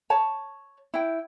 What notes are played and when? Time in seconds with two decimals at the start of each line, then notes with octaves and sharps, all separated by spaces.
0.10 C#5 A5
0.94 E4 G5